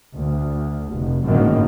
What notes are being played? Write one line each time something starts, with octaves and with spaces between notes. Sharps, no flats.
D2
F1
G#1 F#2 A2 D3 D#3 A#3